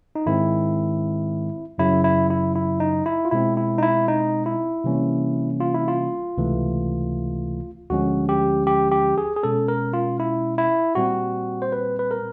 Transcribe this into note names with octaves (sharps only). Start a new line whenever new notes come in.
D#4
G#2 D#3 G#3 C4 E4
F#2 C#3 F#3 E4
E4
E4
E4
D#4
E4
F4
B2 G#3 C4 E4
E4
D#4
E4
D#4
E4
C3 E3 G3 A#3 C#4
F4
E4
F4
C#2 C3 E3 A3
D2 D3 F3 G#3 C#4 F#4
G4
G4
G4
G#4
G#4
B2 G#3 C#4 A4
A#4
F4
E4
E4
A#2 G3 C4 F#4
C5
B4
B4
A#4